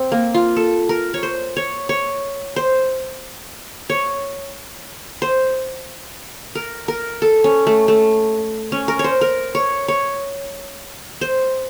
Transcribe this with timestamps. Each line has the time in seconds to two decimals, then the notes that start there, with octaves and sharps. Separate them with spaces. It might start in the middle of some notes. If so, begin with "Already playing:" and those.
Already playing: C4
0.12 A#3
0.34 F4
0.57 A4
0.89 A#4
1.14 C#5
1.23 C5
1.57 C#5
1.89 C#5
2.56 C5
3.90 C#5
5.22 C5
6.55 A#4
6.88 A#4
7.22 A4
7.44 C#4
7.67 A3
7.88 A3
8.72 C#4
8.88 A#4
8.99 C#5
9.04 C5
9.21 A#4
9.55 C#5
9.88 C#5
11.21 C5